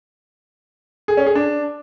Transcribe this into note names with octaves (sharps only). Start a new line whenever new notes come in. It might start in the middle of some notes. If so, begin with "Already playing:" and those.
G#4
C#4
G#4
D4